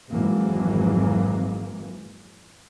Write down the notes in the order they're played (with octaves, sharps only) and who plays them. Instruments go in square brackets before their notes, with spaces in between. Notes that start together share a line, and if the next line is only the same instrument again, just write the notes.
[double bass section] G#1 F2 G#2 E3 F#3 A#3